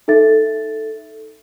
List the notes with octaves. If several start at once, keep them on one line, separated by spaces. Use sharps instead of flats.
D#4 A4 E5 A6